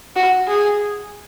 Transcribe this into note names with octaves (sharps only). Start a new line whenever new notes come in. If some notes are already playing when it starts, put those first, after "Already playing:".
F#4
G#4